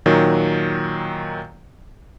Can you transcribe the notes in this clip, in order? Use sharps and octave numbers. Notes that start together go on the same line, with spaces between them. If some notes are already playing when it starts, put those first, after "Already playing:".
A#2 D#3 F#3